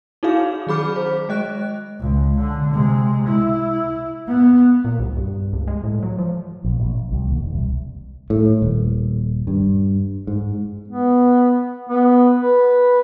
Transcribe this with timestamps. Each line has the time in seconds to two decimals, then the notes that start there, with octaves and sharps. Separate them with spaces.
0.23 D#4 E4 F#4 G#4 F5
0.67 D#3 F#3 G#4 B5 D6 F6
0.96 C5
1.29 G#3 D#5 F#6
1.99 C#2
2.40 D3
2.73 C3 G#3
3.28 E4
4.27 B3
4.85 A#2
4.99 C2
5.17 G2
5.53 C#2
5.68 G#3
5.84 A2
6.03 F#3
6.18 F3
6.64 A#1
6.80 A#1
6.95 A#1
7.12 C2
7.27 D#2
7.40 E1
7.54 C2
8.30 A2
8.62 D#1
9.47 G2
10.27 G#2
10.88 B3
11.89 B3
12.40 B4